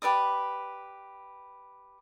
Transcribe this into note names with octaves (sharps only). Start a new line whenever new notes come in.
G4 B4 D5 D#6